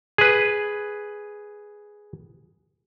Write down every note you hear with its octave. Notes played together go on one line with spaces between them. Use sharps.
G#4 B4